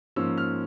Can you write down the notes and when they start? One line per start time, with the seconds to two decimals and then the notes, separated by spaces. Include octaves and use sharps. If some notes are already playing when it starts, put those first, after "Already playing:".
0.16 G#2 F3 A#3 C#4 E6
0.38 F6